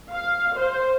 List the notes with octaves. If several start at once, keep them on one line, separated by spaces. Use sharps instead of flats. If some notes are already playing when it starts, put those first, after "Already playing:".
F5
C5